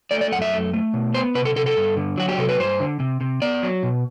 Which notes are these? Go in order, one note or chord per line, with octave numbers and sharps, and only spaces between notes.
A3 D5
D5
F#2 F#5
E5
A3
A3
B2
B3 C5
C3 B4
A4
C3 A4
A4
G2
D3
F#3 F#4
G4
C3 A4
B4
G2 C5
D3
C3
C3
B3 D5
F#3
B2